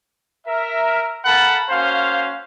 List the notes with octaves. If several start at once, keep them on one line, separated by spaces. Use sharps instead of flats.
A#4 E5
A4 A#4 F5 F#5 A5 B5
A#3 C#4 F#4 C5 F5